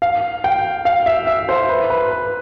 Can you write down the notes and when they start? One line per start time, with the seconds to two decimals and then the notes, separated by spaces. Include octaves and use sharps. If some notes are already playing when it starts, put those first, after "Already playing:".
0.02 F5
0.44 G5
0.85 F5
1.06 E5
1.27 E5
1.49 C5
1.69 B4
1.90 B4
2.11 B4